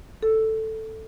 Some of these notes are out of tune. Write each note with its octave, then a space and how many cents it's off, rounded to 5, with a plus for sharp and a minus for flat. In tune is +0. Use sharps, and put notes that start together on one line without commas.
A4 +5